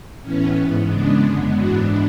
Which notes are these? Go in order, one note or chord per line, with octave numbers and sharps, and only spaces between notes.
A2 E3 B3 C#4
G#2 E3 B3
C#3 G#3 B3 D4
F#2 D3 G#3 B3
G#2 E3 B3 D4 F#4